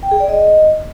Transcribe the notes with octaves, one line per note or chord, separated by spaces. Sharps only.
G5
G#4
D5
D#5